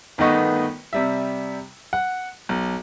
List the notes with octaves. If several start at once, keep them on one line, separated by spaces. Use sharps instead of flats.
G1 D#3 A3 B3 D#5 C#6
C3 G3 E5
F#5
B1